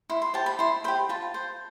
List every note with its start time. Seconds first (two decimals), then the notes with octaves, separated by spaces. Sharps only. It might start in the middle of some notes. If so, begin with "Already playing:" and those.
0.10 E4 C6
0.22 C6
0.34 G4 C5 A5
0.46 B5
0.59 E4 C6
0.84 G4 C5 B5
1.09 F4 A5
1.34 C5